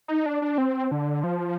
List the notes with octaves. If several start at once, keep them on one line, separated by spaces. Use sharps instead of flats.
D#4
D4
D4
C4
D3
F3